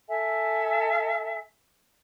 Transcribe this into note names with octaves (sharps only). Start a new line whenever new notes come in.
A4 E5 G#5